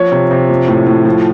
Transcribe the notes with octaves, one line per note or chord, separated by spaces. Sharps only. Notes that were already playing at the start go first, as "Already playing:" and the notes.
Already playing: F3 C#5
C3
C3
F3
A2
A2
F3